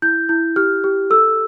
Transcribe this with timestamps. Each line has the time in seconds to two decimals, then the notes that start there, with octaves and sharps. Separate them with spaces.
0.02 E4 G6
0.29 E4 G6
0.56 G4 F6
0.84 G4
1.10 A4 E6